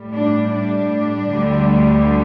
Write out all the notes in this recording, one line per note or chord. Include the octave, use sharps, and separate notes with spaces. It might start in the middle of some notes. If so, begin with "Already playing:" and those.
Already playing: A2 G3
D4
D4
D2 D3 G3